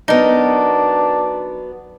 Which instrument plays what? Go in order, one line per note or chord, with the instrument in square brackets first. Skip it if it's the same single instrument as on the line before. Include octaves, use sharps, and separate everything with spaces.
[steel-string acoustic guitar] F#3 B3 [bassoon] D4 [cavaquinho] D#4 A#4